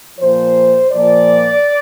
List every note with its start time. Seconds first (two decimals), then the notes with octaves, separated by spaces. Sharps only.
0.18 A#2 F3 C5
0.91 A#2 F3 D5